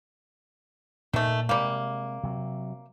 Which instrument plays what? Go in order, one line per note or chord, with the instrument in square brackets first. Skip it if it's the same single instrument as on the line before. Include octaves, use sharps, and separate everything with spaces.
[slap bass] A#2 [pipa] D#3 A3
[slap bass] C3 G#3 [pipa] G3 A#3
[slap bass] C3 F#3